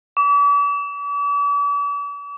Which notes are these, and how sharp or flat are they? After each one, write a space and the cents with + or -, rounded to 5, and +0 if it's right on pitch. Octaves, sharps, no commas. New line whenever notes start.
D6 -45